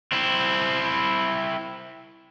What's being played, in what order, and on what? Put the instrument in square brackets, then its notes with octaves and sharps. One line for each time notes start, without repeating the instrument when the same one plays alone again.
[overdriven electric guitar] C4 E4